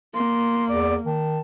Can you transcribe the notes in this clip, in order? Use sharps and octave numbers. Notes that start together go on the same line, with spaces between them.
A#3 C6
E2 D5
D#3 A5